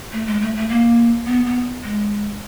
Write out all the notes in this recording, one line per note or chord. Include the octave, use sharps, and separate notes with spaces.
A3
G#3
A3
A3
A#3
B3
B3
G#3